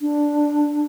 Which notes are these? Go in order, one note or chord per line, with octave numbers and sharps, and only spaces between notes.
D4